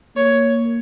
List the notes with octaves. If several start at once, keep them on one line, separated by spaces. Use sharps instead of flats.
A#3 C#5